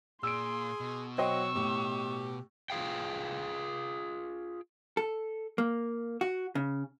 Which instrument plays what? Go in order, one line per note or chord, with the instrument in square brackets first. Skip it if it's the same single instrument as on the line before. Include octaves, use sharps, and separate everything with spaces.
[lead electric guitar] A#2 [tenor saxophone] G#4 [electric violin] C6 [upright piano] E6 D7
[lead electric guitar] B2
[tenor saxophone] F#3 [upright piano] C5 D#5 G5 [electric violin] C#6 E6
[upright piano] A2 [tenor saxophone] G4
[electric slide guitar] F4 G#4 F5 G5
[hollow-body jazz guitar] A4
A#3
F#4
C#3